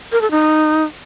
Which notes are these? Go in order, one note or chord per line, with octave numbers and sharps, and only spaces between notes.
A#4
A4
D#4